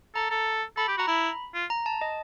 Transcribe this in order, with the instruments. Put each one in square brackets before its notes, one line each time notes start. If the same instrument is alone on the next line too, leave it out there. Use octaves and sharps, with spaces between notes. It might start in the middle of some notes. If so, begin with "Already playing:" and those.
[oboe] A4 [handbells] A#5
[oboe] A4
[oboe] A4 [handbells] B5
[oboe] G4
[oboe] F#4 [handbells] A#5
[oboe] E4 [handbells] B5
[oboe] F4
[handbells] A#5
A5
D#5